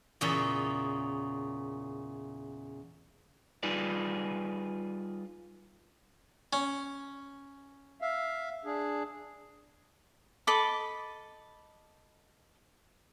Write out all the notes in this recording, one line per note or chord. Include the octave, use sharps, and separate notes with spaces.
E2 A#2 C#3 C#4 E5
G3 D#4 F4 G#4 B4 D5
C#4
E5 F5
D4 G#4
A4 D#5 B5 D6